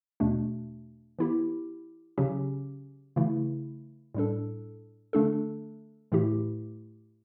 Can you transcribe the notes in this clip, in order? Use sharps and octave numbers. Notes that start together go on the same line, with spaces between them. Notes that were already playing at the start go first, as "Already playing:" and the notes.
E2 B2 A3 D4
E3 B3 E4 G4
C#3 F#3 C#4 G4
C#3 E3 A3 E4
A2 G3 D4 A4
D3 A3 D4 A4
A2 E3 A3 E4 G4